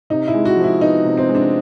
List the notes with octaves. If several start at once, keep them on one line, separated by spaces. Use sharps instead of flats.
C3 D#4
E4
G#3
F#4
F3
E4
B3 D#4
C3
C4
G#3
D4